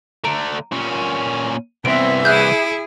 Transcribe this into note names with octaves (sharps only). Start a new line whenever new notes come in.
D3 A3 A#5 D7
A#2 C#4
C2 E3 B3 C4 E5 D7
E4 G#4 E5 F#6 G6 D#7